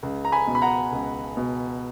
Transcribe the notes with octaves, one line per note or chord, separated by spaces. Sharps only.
C#2
A#5
G#5 B5
B2
B5
F#5 A#5
C#2
B2